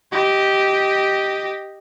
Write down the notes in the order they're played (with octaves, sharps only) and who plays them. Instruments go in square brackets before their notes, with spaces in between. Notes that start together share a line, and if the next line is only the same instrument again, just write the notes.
[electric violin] G4 D#5